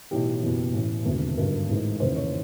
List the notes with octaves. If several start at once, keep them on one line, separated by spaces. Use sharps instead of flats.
B1 A2 E3 G4
F#1 E2 B2
A1 A2 E3
E1 D2 C3 D#3
G#1 G2 D3 A#4
A1 G#2 E3
F1 D#2 C#3 E3 C5
C#5